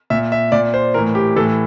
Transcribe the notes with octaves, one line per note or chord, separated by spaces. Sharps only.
A#2 E5
E5
A#2 D5
C5
A2 E3 A#4
G4
A2 E3 A4